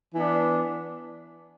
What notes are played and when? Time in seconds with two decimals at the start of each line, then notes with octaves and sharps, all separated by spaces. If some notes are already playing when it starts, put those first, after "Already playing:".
0.13 E3 B3 D4